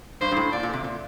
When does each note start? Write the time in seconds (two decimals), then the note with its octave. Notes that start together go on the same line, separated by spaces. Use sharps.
0.21 G2 C5
0.31 G2
0.36 A2
0.52 A#2 D5
0.63 A#2
0.73 C3
0.84 A#2